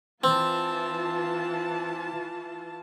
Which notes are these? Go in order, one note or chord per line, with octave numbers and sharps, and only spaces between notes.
E3 C4 F4 A5